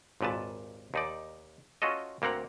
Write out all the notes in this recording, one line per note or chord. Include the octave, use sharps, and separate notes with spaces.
G#1 D#2 A#2 B4 A5
D#2 D#4 D5
C#4 F4 F#4 A4 D#5
D2 A#3 C4 F#5 A#5